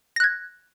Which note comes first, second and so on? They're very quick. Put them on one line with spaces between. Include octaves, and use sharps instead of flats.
A#6 F#6 G#6